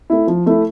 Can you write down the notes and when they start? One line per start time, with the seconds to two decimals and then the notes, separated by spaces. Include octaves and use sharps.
0.10 A3 E4
0.27 F3
0.46 A3 E4